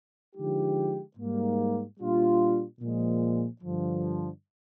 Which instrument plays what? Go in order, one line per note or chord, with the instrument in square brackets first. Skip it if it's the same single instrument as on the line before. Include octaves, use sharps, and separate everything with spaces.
[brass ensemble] D3 F3 G#3 D#4 G4
G#2 G3 A#3
A#2 G3 D4 F4
A#2 F3 G#3
G2 D3 F3